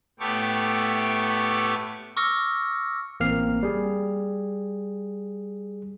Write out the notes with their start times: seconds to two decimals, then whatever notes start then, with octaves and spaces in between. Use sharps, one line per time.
0.19 A2 A3 B3 G4 C#6 D6
2.17 C#6 D6 E6 F6 A#6 C#7
3.20 A1 A#3 C4 F6 C7
3.63 G3 G#4